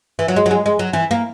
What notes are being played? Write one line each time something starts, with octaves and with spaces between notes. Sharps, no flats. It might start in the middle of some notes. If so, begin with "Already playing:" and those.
E3
F#3
G#3
F#3
G#3
G#3
F#3
E3
A#3